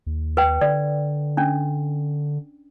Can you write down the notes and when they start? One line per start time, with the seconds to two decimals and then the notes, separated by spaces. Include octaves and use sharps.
0.06 D#2
0.37 B4 G5
0.61 D3 D5
1.37 C#4 D4